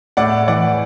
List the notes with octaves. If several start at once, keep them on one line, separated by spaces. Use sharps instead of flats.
A2 D5 F#5
E3 D5 F#5